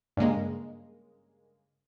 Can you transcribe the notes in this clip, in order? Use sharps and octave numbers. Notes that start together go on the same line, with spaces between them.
G2 C#3 G#3 A#3